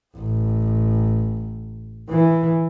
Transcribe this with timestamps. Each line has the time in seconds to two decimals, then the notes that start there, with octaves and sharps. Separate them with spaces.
0.17 A1
2.10 E3